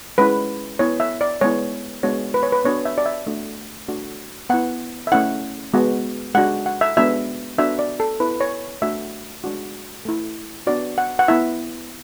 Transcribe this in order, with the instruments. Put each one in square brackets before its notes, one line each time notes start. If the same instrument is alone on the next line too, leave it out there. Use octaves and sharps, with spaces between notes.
[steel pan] G#3 C#4 E4 B4
B3 E4 C#5
E5
D5
G#3 B3 E4 C#5
G#3 B3 D4 F#4 C#5
B4
C#5
B4
B3 D4 F#4 C#5
E5
D5
E5
A3 D4 F#4
A3 D4 F#4
B3 E4 F#5
E5
A3 C#4 E4 F#5
G#3 B3 F#4
G#3 D4 F#4 F#5
F#5
E5
G#3 B3 D4 F#4 E5
B3 D4 F#4 E5
D5
A4
B3 E4 B4
C#5
A3 D4 F#4 E5
G#3 D4 F#4
A3 E4
B3 D4 F#4 D5
F#5
F#5
B3 E4 E5